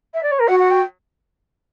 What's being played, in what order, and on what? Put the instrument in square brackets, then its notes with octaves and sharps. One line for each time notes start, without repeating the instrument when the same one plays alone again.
[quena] E5
D5
C#5
A#4
[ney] F#4 [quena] F#5
[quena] F#5
G5